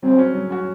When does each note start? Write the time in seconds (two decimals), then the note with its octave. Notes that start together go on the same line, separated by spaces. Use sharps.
0.02 F#3 C4
0.18 C#4 F#4
0.35 F#3
0.51 C#4 F#4